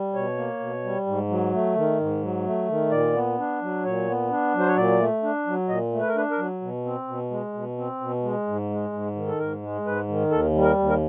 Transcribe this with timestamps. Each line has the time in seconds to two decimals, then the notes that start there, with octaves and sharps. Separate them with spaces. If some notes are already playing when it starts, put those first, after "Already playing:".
Already playing: G3
0.14 B2 C#5
0.37 A#3
0.60 B2
0.84 G3
1.06 G#2
1.29 F#3
1.52 A3
1.76 D#3
2.00 G#2
2.22 F#3
2.46 A3
2.69 D#3
2.91 A#2 D5
3.14 B3
3.38 D4
3.62 F#3
3.84 A#2 C#5
4.08 B3
4.30 D4
4.54 F#3
4.59 C5
4.68 C#5
4.76 A#2 D5
4.99 A3
5.23 D4
5.47 F#3
5.68 A#2 D#5
5.92 A3
6.00 B4
6.08 A#4
6.15 D4 B4
6.31 A#4
6.38 F#3
6.61 B2
6.85 C4
7.08 B2
7.31 G#3
7.54 B2
7.78 C4
8.01 B2
8.23 G#3
8.47 G#2
8.70 G#3
8.93 G#2
9.15 D#3
9.28 A4
9.39 G#2 A#4
9.63 G#3
9.85 G#2 B4
10.08 D#3
10.31 D#2 A4
10.54 G3
10.63 A#4
10.79 D#2
10.89 A#4